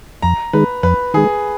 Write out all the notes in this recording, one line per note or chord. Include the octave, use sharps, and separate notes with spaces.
F2 A#5
D#3 G#3 B4
F2 B4
D#3 G#3 G#4